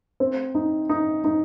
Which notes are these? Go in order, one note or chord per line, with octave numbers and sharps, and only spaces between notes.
C4
D#4
D#4
D#4